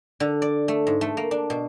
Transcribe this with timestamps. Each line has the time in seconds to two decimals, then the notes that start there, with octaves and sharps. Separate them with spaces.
0.20 D3
0.42 D5
0.68 A3
0.87 G#2
1.01 A3
1.17 A#3
1.31 D4
1.50 B2